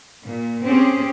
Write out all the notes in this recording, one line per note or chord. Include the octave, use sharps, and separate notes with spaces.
A#2
C4 C#4 G4 G#4 C5